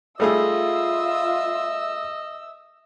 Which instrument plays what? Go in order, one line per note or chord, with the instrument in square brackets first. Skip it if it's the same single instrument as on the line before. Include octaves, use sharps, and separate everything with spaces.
[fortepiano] G3 A3 G#4 [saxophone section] F4 [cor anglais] D#5 [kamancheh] E5 E6